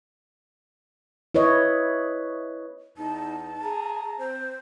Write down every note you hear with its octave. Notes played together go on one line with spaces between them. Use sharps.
E4 B4 C#5 D#5
E2 D#4 A5
G#4 A#5
C4 C5